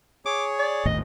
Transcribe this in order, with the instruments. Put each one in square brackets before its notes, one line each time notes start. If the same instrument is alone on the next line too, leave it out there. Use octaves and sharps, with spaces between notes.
[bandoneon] G#4 C#5 [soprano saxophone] D6
[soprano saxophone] D5
[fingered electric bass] G#1 D#2 A2 [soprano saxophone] D#5